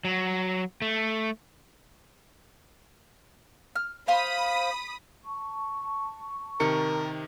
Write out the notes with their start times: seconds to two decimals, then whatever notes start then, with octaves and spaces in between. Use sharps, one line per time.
0.05 F#3
0.82 A3
3.76 F6
4.08 C5 F5 B5 D#6
5.24 A5 C#6
6.60 C3 D#3 A#4 C#7